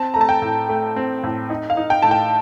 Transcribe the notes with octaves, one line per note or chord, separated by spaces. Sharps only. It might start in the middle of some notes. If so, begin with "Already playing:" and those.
Already playing: C4 A5
A3 A#5
A5
G5
A2
A3
C4
A2
D#4
F5
D#4
G5
A2 A5
G5